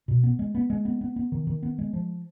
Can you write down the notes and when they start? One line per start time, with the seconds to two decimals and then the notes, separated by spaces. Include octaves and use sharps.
0.08 B2
0.24 B3
0.39 G#3
0.55 B3
0.70 G#3
0.85 B3
1.01 B3
1.16 B3
1.32 D#3
1.47 D#3
1.63 B3
1.79 G#3
1.93 F3